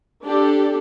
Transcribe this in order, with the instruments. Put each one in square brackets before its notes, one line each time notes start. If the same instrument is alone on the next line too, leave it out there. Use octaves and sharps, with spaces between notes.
[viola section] D4 G4 A4